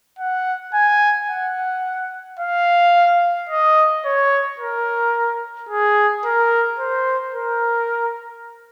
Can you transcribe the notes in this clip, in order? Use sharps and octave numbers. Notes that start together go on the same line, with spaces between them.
F#5
G#5
F#5
F5
D#5
C#5
A#4
G#4
A#4
C5
A#4